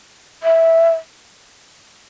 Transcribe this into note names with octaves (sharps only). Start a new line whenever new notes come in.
E5